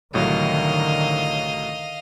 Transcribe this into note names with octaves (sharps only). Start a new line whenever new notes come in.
C2 A2 D3 D#3 F#3 D#5 F5